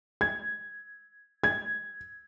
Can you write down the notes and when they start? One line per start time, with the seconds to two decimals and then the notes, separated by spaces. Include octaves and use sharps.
0.21 G#6
1.44 G#6